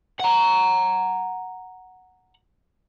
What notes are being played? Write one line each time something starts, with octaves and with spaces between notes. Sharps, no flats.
F#5 A#5